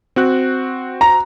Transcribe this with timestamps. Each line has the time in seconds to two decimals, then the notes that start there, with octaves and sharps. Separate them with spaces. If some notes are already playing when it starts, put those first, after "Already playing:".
0.16 C4 F#4 F#6
1.01 A#5